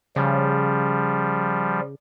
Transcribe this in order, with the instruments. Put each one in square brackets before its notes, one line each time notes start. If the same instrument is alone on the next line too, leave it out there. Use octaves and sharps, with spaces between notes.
[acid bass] C#3 [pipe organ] F3 G3